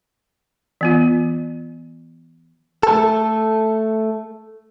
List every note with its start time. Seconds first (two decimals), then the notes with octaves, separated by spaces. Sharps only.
0.81 E3 B3 F4
2.83 A3 A4